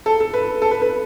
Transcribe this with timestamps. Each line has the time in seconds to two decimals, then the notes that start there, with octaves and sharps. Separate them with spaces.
0.06 A4
0.20 A4
0.34 B4
0.62 A4
0.71 B4
0.82 B4